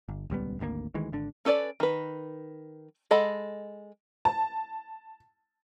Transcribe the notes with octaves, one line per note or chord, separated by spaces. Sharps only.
G1
D#1 C#2 G3 B3
G#1 D2 C3 A#3
D2 D#3 E3 G#3
G#1 D3 D4
C#4 A4 B4 C#5 D5
D#3 B4
G#3 A4 D#5 F#5 B5
A5